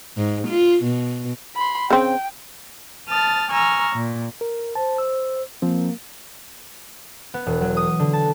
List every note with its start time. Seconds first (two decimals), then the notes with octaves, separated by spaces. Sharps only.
0.17 G#2
0.47 F4
0.83 B2
1.55 B5 C6
1.90 C#3 C4 G5
3.09 A5 D#6 F6 A6
3.51 G#5 A#5 C#6 E6 F6
3.94 A#2
4.41 A#4
4.75 C5 A5
4.98 E6
5.62 F3 A#3 C4
7.34 B3
7.46 E1
7.61 F#3
7.77 D#6
7.99 D3
8.13 A5